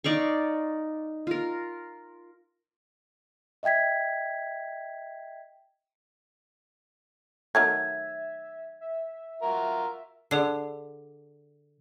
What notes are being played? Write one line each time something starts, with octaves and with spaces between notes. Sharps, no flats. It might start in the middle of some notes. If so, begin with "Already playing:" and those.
D#4 D5 F5 C#6
F4 A#4
D#5 E5 G5 G#6 B6
D#3 F#3 A3 E5 G#6
E5
F4 F#4 A#4
D3 G#4 D5 C7